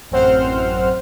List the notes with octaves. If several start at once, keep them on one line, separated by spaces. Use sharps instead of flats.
A1 F#2 C4 C5 F#5 F6